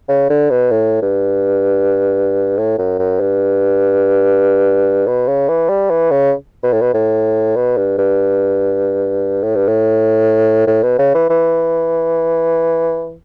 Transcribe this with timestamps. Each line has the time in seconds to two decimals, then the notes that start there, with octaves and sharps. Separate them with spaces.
0.08 C#3
0.30 D3
0.50 B2
0.71 A2
1.02 G2
2.58 A2
2.78 F#2
2.99 F#2
3.20 G2
5.07 B2
5.28 C#3
5.48 E3
5.69 G3
5.90 E3
6.11 C#3
6.63 B2
6.72 A2
6.81 B2
6.94 A2
7.56 B2
7.77 G2
7.98 G2
9.43 A2
9.56 G2
9.68 A2
10.67 A2
10.83 B2
10.98 C#3
11.14 E3
11.30 E3